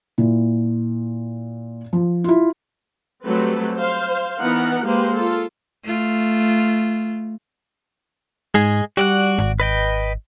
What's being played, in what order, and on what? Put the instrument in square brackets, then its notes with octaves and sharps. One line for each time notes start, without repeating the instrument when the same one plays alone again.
[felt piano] A#2 E4
F3
E4 F4
[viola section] F#3 G3 A3 C4 B4
C5 F5
E3 B3 D#4 A#4 F#5
G#3 A#3 G4 B4 C5
F4 A4
[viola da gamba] A3 F4
[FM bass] G#2 [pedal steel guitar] G#3 G#4
[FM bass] G3 [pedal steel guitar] F#4 D5 F#5
[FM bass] G#1
[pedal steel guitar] B4 D#5 G5